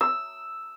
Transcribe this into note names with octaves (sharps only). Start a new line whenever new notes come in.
E6